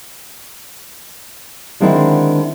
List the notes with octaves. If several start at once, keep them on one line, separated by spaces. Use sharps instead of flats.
D3 D#3 G#3 C4 D4 E4